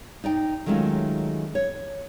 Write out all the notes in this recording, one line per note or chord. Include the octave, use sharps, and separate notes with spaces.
D#4 D5 G5
D#3 F#3 G#3 A3 C#4 F4
C#5